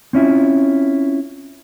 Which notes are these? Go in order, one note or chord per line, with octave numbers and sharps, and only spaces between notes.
C4 C#4 E4 F4